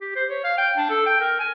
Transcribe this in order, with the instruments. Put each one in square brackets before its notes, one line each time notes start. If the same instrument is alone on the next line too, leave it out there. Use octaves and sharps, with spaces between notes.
[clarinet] G4
C5
C#5
F5
G5
D4
A4
G5
A#4
G#5